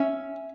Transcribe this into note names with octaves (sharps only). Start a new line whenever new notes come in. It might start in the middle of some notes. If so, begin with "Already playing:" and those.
Already playing: C#4 E5